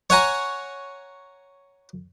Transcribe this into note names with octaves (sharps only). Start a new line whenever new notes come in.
C#5 F#5 G#5 A#5